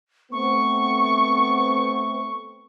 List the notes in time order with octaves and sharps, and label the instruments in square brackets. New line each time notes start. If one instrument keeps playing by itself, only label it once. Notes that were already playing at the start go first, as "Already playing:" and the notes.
[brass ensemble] A3 B3 C4 [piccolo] C#6